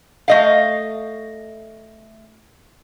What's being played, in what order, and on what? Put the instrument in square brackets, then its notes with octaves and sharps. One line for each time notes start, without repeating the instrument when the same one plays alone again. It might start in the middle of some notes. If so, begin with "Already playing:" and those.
[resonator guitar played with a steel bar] A3 D#5 F5